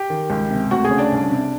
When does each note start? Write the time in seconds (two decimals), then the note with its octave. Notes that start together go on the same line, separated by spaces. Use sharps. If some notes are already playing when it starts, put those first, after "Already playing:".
Already playing: G4 G5
0.10 D#3
0.30 C#2
0.50 C3
0.71 D2 F#4 F#5
0.85 G#4 G#5
0.91 C#3
0.98 D4 D5
1.12 C2
1.32 C3